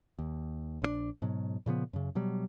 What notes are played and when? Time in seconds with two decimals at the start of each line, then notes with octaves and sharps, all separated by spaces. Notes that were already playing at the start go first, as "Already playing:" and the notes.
0.19 D#2
0.82 A#1 D3 D4
1.22 G#2 B2 F#3
1.66 A#2 C#3 F3 B3
1.93 F#2 C#3
2.15 B2 F#3 G3